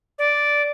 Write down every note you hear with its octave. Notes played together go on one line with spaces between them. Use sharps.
D5